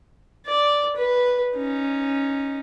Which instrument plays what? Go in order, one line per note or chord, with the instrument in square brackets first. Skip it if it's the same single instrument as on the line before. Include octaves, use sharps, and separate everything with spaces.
[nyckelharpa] D5
B4
C#4 D#4